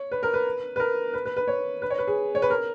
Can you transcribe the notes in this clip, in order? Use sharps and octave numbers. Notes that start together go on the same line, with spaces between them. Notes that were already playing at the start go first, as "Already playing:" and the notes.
Already playing: C#5
B4
A#4
B4
B4
A#4
B4
B4
B4
C#5
B4
C#5
B4
G#4
C#5
B4
A#4